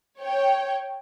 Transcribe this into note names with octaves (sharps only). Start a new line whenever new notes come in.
C#5 G5